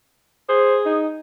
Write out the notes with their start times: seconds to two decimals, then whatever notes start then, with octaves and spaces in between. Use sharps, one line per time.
0.49 G#4 C5
0.86 D#4